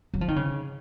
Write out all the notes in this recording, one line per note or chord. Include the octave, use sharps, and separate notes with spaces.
F#3
F3
D#3
C#3